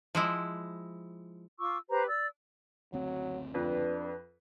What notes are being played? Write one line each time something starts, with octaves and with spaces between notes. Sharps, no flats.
F3 G#3 E4
F4 C#6 D6 E6
G4 B4 C5 A#5
D5 E6
F#1 D2 F#3 C4
F2 D4 B4